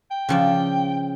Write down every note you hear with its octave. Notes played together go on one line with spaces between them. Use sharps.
G5
C#3 F3 D5